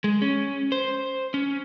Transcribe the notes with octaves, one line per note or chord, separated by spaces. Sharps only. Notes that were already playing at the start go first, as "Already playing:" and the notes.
G#3
C#4
C5
C#4